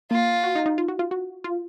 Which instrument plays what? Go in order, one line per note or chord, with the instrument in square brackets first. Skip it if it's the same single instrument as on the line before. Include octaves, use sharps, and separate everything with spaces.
[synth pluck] A#3 [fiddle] F4
[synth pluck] F#4
D#4
D#4
F4
F#4
F4
F#4
F4